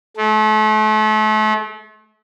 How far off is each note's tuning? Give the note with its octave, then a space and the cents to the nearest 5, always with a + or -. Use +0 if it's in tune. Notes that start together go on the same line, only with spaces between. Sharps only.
A3 -35